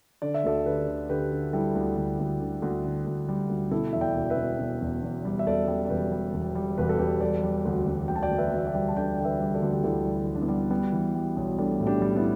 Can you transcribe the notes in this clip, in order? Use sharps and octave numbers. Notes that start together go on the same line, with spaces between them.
D3 D5
E5
D2 A4 D5
D3 G4 B4
D3
D3 G4 B4
D3
G3 E4 A4
D2
D2
D2
D3
D2
D3
D2
G3
D2
B2 E4 A4
E2 E5
D5 G5
E1
B4 E5
B2
B2
E2
E2
G3
E5
E1 A4 D5
G3
D5
E1 G4 B4
G3
E1
G3
E1 B4
A4
E1 G4 B4
G3 A4 D5
G3
D2
D2
D2 G5
A5
D5 G5
D2
B4 E5
D2
E5
D5 G5
G3
A5
D3 D5 G5
D3 G5
B4 E5
G3
A4 D5
D2
G4
D2 E4 A4
G3
G3
D4
B3 E4
G3
G3 B3
E3
G3
B1
G3 A3 D4
A2
D4 G4
G3
B3 E4